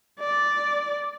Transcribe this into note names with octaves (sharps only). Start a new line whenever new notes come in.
D5